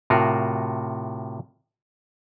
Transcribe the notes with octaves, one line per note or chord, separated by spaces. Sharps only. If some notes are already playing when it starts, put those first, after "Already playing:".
A2 C3 F4 F#4 A#4